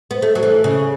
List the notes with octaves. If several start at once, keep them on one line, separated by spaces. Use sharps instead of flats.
B3
A3
F#3
E3
C#3